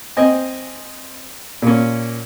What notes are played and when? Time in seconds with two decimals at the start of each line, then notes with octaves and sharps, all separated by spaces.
0.17 C4 D#5 G#5
1.62 A#2 C#4